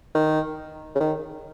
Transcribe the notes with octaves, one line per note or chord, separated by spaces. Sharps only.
D#3
C#3
D#3